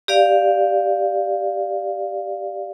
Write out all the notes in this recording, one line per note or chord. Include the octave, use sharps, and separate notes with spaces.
G4 D5 F5